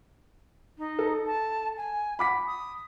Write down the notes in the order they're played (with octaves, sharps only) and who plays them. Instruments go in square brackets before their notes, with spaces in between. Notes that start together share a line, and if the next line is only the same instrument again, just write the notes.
[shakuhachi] D#4
[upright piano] A4
[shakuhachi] A5
G#5
[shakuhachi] F#5 [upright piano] B5 D6 B6
[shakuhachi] D#6